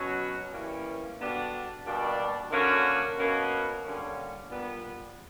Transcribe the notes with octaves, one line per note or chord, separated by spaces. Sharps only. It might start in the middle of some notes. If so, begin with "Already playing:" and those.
Already playing: B2 F#3 C#4 F#4
E3 G3 A#3 C#4
D3 G3 B3 D4 F#4
B2 G3 A#3 D4
D3 A#3 C#4 F#4
B2 A#3 C#4 F#4
D3 G3 A#3 C#4
A#2 G3 B3